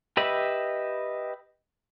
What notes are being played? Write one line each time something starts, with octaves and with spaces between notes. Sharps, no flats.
G4 B4 D#5 E5 B5